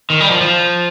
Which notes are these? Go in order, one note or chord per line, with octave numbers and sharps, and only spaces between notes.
D#3
G3
F3
F3